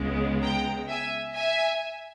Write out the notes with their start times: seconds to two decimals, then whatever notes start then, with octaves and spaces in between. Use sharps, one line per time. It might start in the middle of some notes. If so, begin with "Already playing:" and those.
Already playing: C#2 C#3 G#3 B3
0.42 G5 A#5
0.89 E5 G#5
1.36 E5 G#5